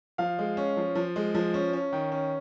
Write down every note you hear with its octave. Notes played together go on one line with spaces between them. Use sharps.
F3 F5
G#3
C#4
F3
F3
G#3
F3
C#4
C#4
D#3
C#4